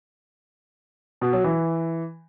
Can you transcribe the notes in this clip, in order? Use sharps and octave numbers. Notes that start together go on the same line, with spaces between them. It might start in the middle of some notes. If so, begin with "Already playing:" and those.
B2
F#3
E3